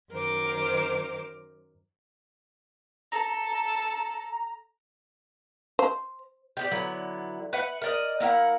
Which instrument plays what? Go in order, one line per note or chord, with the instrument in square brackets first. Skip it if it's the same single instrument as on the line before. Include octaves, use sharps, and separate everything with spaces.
[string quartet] F#2 D#3 A#4 C5 D6
[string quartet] A4 [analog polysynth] A#5
[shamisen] C5
[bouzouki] G4 G#4 D5
D3 F#3 B3 E4
B4 E5 F#5
A#4 D5 D#5
A#3 E4 A#4 F#5